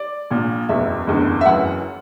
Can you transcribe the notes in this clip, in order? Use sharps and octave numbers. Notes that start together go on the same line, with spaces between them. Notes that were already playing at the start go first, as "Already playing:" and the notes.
Already playing: D5
A#1 A#2
F#1 E2 B2 E5
F#1 E2 D3
E5
F#1 F#2 E3 F#5